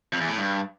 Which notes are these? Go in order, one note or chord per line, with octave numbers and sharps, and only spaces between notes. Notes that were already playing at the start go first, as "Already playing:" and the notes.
F2
E2
A2
G2